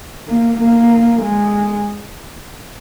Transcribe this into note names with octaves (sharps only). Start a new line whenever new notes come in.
A#3
A#3
G#3